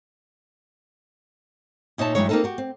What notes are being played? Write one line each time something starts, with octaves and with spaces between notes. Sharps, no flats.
A#2 D#4 C#5 E5 A5
G2 B2 E3 F#3 G#3 C#5
A#3 C4 D4 D#4 F4 A4
F#4 G4
C4